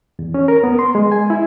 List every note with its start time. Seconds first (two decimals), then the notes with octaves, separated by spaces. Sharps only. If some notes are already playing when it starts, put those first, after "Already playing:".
0.19 E2
0.34 C#4
0.48 A#4
0.64 B3
0.79 C6
0.95 G#3
1.12 G#5
1.30 E4